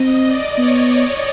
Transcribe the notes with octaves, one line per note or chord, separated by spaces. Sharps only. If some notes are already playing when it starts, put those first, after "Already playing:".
Already playing: C4 D#5
D5
B3 C#5
C#5